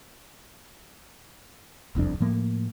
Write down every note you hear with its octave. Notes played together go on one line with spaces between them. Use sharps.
E1 C2 F2 D4
A2 F3 A#3